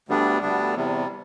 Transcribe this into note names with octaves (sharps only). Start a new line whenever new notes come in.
D2 D3 G3 B3 D4
D2 D3 G3 B3 D4
E2 C3 G3